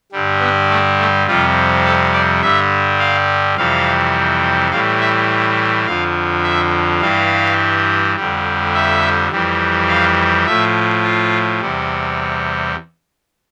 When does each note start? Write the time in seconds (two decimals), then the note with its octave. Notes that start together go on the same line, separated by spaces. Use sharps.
0.12 G2 D3 G3
0.40 B3
0.69 A3
0.99 A3
1.27 F2 C3 G3 F4
1.85 A4
2.13 D5
2.41 G2 D3 G3 E5
2.99 F5
3.57 F2 C3 E3 G3 F5
4.71 A2 E3 G3 F5
5.01 E5
5.86 F2 D3 F3 F5
6.44 E5
7.01 G2 E3 G3 F5
8.16 F2 D3 G3
8.74 E5
9.32 F2 E3 G3
9.88 F5
10.46 A2 F3 E5
11.04 F4
11.61 E2 C3 G3